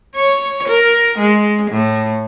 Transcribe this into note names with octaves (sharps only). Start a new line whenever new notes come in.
C#5
A#4
G#3
A2